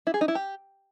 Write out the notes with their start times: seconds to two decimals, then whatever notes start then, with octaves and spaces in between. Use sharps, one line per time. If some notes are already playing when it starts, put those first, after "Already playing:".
0.07 E4
0.14 G#4
0.21 D#4
0.28 E4
0.35 G4